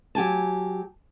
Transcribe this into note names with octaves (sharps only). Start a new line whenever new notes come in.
F#3 G4 G#5 A5